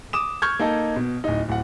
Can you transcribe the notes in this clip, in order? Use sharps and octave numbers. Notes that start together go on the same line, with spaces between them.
D6 D#6 E7
C#6 F6 G6 G#6
A#3 D#4 A4
B2
D1 D#4
D1 F#5